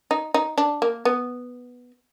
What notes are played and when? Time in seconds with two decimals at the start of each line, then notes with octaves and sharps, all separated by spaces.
0.11 D#4
0.34 D#4
0.58 D4
0.82 A#3
1.05 B3